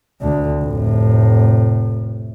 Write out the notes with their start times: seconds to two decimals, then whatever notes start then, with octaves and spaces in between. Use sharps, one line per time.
0.21 D2 D3
0.62 F1 A2